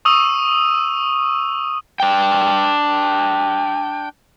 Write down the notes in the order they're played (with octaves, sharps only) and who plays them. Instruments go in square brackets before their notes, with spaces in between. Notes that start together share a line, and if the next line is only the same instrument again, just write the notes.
[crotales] C#6 D#6 E6 D#7
[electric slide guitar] D4 G5